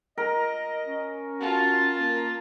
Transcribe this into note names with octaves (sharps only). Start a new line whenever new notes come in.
A#4 D#5
C#4
F4 F#4 A5
A#3